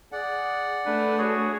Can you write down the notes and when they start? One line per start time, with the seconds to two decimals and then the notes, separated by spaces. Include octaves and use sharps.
0.12 G#4 D5 F#5
0.86 A3 D4 B4
1.18 F#4 G#4 C#5